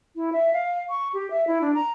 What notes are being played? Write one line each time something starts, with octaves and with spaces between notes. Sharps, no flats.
E4
E5
F5
C#6
G4
E5
E4
D4
A#5